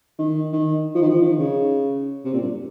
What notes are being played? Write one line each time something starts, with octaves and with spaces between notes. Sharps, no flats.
D#3
D#3
F3
D#3
F3
D#3
C#3
C3
A#2
G2